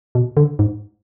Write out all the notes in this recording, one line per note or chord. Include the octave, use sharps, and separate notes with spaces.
B2
D3
G#2